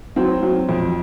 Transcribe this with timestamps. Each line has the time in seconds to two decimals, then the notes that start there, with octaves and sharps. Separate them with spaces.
0.16 F#3 C4
0.43 F#3
0.69 F2